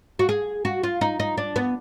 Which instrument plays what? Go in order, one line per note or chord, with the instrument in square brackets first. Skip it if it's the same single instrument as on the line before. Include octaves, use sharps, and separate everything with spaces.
[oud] F#4
G#4
F#4
F4
D#4
D#4
D4
B3